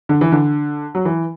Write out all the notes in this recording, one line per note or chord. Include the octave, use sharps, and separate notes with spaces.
D3
E3
D3
F#3
E3